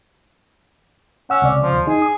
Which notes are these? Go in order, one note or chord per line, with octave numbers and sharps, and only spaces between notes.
C#4 F#5 E6
C#2 C3 D5
F3
D#2
D#4 G#4
D#6